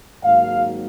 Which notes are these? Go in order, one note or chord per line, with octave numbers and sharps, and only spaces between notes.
G#1 G#2 F#3 A#3 F5